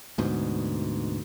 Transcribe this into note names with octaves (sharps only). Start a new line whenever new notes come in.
D2 G#2 B2